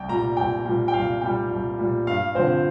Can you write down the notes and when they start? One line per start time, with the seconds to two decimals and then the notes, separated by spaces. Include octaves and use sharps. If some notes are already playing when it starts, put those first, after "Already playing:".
Already playing: C2 G5
0.08 A#2 G3 A#5
0.37 C2 G5
0.65 A#2 G3 G5
0.88 G5
0.94 C2 F5
1.21 A#2 G3 G5
1.51 C2
1.78 A#2 G3
2.07 G2 F5
2.35 D3 F3 C4 C5